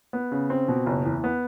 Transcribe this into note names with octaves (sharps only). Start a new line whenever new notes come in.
B3
C#3
C4
B2
F#1
E2
B3